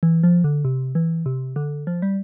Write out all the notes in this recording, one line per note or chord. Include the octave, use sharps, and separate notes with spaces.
E3
F3
D3
C3
E3
C3
D3
F3
G3